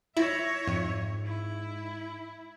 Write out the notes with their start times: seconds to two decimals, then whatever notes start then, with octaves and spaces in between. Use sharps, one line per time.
0.17 E4 C#5 E5 A#6
0.67 F2 G#2
1.26 E4